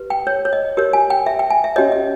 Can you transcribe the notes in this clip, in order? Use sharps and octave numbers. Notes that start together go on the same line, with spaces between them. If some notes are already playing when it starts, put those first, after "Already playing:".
Already playing: G4 B4
G5
C#5
C#5
D#5
G4 A#4 C#5
G#5
G5
E5
G5
G#5
E5
C#4 G4 C#5 D#5
D#5